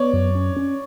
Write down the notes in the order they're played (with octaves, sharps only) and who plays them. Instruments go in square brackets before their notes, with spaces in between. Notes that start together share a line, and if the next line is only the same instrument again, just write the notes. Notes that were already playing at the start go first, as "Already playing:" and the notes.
Already playing: [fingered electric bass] B3 [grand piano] C#5 D5
[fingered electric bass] F#2
C#4
C#4